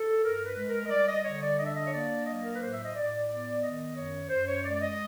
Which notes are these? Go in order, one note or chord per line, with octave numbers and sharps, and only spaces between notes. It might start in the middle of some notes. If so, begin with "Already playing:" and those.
Already playing: A4
G2 A#4
B4
G#3
A#4
D#5
G3 D5
D#5
D3 C#5
D5
D4 D#5
E5
D#5
C#5
A#3 D5
F#3 D#5
A#4
B4
A2 C5
E5
D#5
A2 D5
B3 D5
D#3 D#5
F#2 C#5
F#2 C5
C#5
G#3 D5
D5
D#5